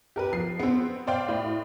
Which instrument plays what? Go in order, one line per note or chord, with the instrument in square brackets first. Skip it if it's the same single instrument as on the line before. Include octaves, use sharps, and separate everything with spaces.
[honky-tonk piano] G4 A#4 B4
F3 C7
B3 C4
C5 D5 F5 G5
A2